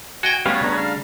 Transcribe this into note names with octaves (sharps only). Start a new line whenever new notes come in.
F#4 D#5 G5 G#5
G3 A3 B3 C#4 G4 B4 F5
C#3 D4 A#5
F5